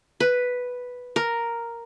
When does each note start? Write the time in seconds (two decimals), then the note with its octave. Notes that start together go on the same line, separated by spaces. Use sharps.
0.20 B4
1.16 A#4